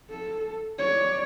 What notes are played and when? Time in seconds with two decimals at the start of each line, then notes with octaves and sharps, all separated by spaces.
0.10 A4
0.79 C#5 D5